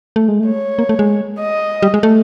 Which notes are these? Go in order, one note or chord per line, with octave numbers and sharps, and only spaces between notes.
A3
G#3
A3
C#5
A#3
A3
G#3
D#5
G3
G#3
A3